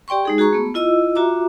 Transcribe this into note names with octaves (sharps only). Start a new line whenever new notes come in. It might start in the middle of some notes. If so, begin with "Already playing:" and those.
G4 D5 G5 C6 C#6
G#3 D#4 G#4
F#4 G#4 A#5 C#6
A3 B3
E4 F4 D#5 E6
F4 F#4 E5 A#5 D6